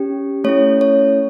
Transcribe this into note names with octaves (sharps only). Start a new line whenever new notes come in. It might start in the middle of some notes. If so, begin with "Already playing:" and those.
Already playing: C#4 G4
A3 C#4 E4 C#5
C#5